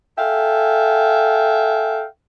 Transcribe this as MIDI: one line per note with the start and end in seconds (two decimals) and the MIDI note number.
0.18 2.05 69
0.18 2.05 76
0.18 2.05 77
0.18 2.05 79
0.18 2.05 80